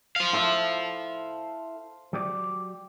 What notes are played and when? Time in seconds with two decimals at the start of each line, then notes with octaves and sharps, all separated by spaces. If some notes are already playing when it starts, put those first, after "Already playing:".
0.16 C5 F5
0.33 E4 A4 E5
2.13 F#3 G4 D5